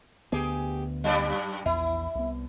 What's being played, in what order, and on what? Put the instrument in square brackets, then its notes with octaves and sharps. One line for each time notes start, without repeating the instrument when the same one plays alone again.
[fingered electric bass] D2 B3 [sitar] G4 G#4
[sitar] F#2 G3 D5
[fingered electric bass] A#1 E2 [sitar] E4
[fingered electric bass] C2 B3